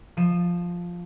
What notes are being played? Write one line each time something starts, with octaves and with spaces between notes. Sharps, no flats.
F3 D#7 E7